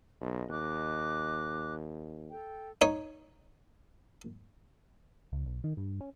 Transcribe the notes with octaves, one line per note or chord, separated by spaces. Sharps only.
B1 D#5
D#2 D#5 D6 F#6
A4 G5
D#4 C#5
C#2
B1
D#3
G2
C#4